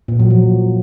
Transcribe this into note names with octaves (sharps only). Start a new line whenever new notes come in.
A#2
F#3
F3